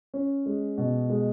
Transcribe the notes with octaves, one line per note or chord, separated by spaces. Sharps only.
C#4
G#3
B2
G#3